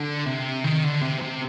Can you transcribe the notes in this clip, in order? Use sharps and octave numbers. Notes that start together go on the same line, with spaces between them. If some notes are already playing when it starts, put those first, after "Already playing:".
Already playing: D3
C3
D#3
D3
C3
C3